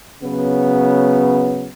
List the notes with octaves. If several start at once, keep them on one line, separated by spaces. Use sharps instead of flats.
C#3 F#3 B3